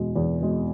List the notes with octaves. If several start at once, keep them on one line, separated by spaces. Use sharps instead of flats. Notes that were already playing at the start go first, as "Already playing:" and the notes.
Already playing: E2 B2 G#3
E2
B2 G#3